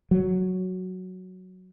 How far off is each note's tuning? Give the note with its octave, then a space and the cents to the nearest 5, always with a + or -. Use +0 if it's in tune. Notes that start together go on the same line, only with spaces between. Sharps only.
F#3 +0